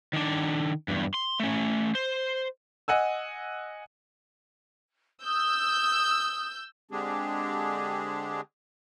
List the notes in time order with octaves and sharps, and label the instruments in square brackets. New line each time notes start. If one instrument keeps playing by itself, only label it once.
[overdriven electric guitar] D#3 D4
E2 G2
C6
A3 C#4
C5
[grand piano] D#5 F#5 G#5 E6
[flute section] D#6 [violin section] E6 G6
[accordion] D3 G#3 C4 D4 G4 G#4